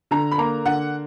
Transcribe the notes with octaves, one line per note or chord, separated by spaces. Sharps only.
D3 A#5
B5
A#3 A#5
D3 F#5